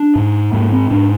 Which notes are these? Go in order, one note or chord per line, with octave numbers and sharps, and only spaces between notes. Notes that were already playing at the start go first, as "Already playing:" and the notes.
Already playing: D4
G#2
G#2 A#3
C4
G#2 D4